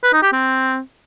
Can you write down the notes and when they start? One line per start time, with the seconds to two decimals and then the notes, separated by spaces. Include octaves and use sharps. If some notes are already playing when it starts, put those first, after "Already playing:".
0.04 B4
0.13 D#4
0.23 G4
0.32 C4